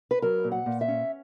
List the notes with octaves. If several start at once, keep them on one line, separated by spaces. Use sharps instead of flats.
B4
F#3 A#4
A#2
F#5
A#2
E5
C#4